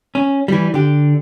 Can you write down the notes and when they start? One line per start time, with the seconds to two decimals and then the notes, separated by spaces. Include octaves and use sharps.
0.15 C#4
0.48 E3 G3
0.74 D3 G4